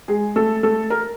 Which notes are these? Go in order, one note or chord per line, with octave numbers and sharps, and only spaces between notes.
G#3 G#4
A3 A4
A3 A4
A#4